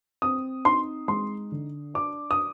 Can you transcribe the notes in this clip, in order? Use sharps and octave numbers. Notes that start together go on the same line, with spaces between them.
C4 D#6
D#4 C6
G#3 C6
D3
D4 D6
D#6